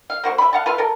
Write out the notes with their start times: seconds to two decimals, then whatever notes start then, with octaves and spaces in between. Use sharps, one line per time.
0.10 F5
0.24 A#3 F#4 C5
0.38 E5 B5
0.53 F5 F#5 A5
0.66 F4 B4 E5 F5
0.78 A4 A#4